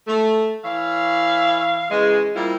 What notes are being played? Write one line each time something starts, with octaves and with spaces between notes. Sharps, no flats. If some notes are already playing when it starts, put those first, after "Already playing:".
A3
E3 C#5 E5 F5
C#3 E3 G#3
G3 A#3 C4 E4 F4